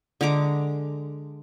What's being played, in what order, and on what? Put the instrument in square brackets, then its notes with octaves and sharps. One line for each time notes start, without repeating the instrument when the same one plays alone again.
[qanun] D3 G#3 A#5 D6